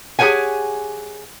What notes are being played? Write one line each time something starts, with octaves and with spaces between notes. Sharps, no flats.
G4 G#4 A#4 C#5 F#5 G#5